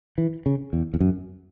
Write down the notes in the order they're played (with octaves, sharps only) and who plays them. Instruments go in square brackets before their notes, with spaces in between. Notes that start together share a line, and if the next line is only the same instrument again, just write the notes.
[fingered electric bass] E3
C#3
E2
E2
F#2